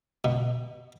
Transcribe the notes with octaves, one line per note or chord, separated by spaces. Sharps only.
B2